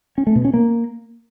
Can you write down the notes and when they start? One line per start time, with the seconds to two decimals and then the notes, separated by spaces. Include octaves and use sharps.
0.18 C#4
0.27 A3
0.36 B2
0.45 C#4
0.54 A#3